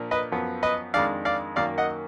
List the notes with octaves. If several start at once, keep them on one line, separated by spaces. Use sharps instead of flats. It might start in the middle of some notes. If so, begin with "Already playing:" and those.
Already playing: A#2 F3 A#3 D4
B4 D#5
F#2 F3 B3
B4 D#5
F2 D#3 G#3 D4 D5 F5
D5 F5
F#2 D#3 A#3 D5 F5
D#5 F#5